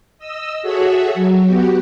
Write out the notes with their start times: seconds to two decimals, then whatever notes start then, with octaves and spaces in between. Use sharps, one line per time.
0.18 D#5 E6
0.62 F#4 G#4 A4 C#5 E5 F#5
1.14 F#3
1.46 B3 F#4 G4